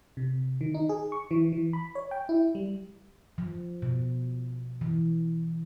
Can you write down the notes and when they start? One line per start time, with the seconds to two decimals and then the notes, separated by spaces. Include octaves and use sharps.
0.17 C3
0.61 D#3
0.74 D#4
0.89 G#4
1.12 C#6
1.31 E3
1.52 E3
1.73 B5
1.95 C#5
2.11 G5
2.29 E4
2.55 G3
3.38 F3
3.82 B2
4.81 E3